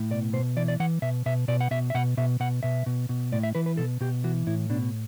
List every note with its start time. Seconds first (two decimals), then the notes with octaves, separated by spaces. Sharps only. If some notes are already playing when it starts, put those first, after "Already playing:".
Already playing: A2
0.11 B2 D5
0.33 B2 C5
0.56 E3 D5
0.68 D5
0.80 E3 F#5
1.02 B2 E5
1.26 B2 E5
1.48 B2 D5
1.61 F#5
1.71 B2 E5
1.90 E5
1.94 B2 F#5
2.17 B2 E5
2.40 B2 F#5
2.63 B2 E5
2.86 B2
3.09 B2
3.32 A2 D5
3.43 E5
3.55 E3 B4
3.66 B4
3.77 B2 A4
4.01 B2 G4
4.24 E3 F#4
4.47 A2 E4
4.70 B2 D4